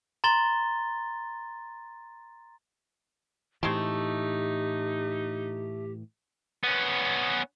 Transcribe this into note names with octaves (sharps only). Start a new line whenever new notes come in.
A#5 C6 A6 G7
A2 E3 G#3 A3 C4 D#4 G4
B3 C#4